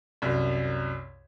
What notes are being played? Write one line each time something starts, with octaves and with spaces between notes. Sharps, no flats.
C2 F#2